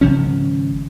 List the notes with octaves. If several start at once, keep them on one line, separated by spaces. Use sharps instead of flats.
G#1 C#3 F3 C#4